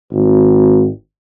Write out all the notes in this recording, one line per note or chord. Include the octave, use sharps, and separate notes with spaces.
G#1